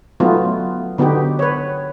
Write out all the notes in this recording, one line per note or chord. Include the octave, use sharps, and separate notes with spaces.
F#3 A3 B3 D#4 F4
D3 B3 D#4 F#4 G4
B4 C#5